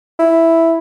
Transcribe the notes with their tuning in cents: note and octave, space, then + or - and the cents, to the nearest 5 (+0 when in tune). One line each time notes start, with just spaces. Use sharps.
E4 +0